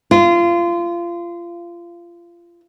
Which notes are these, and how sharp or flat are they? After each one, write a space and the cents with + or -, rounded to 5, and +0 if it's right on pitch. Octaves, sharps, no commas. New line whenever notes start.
F4 -25